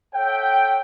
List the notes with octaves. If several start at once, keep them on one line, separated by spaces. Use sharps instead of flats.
A4 C#5 E5 F#5 G5